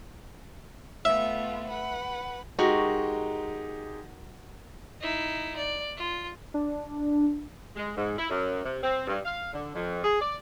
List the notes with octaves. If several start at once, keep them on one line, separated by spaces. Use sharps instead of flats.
A3 B3 F4 E5
B4 F#5
G#3 D#4 F#4 G4 A#4 C#6
D#4 E4
D5
F4
D4
G#3
G#2
E4
F#2
C3
C4
G2
F5
D3
F2
G#4
D5